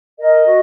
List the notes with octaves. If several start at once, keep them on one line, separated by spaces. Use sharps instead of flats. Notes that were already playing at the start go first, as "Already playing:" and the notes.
A#4 D#5
F#4